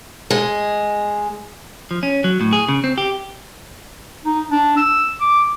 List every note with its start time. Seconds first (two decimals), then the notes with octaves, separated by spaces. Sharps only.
0.30 G#3
1.91 F3
2.03 C#4
2.24 F#3
2.41 A2
2.53 G#4
2.69 C#3
2.84 C4
2.98 G4
4.25 D#4
4.51 D4
4.77 E6
5.21 D6